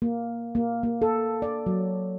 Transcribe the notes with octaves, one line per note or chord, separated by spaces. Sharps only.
A#3
A#3
A#3
A4
D5
F#3